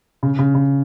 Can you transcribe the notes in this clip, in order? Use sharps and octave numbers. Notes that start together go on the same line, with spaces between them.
C#3
C#3
C#3